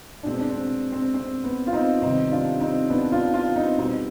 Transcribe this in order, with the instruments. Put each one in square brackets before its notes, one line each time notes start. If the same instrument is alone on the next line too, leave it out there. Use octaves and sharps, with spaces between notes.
[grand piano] D4
B2 G#3 B3 C4
D4
C4
C4
C4
B3
F4
C4 D#4
C3 D#3 G3 B3 C4 D#4
D4 F4
C4 D#4
B3 D4
D4 F4
D4 F4
C4 D#4
B2 G3 B3 C4 D#4